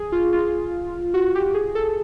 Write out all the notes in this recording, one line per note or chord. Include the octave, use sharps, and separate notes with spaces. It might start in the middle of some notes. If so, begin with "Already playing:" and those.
Already playing: G#4
F4
F4
F#4
G4
G#4
A4